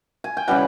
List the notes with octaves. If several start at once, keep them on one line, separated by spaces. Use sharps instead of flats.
G#5
G5
C#3 E3 G3 F#5